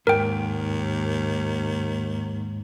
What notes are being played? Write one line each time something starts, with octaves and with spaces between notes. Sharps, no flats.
D#2 G#2 A#4 G5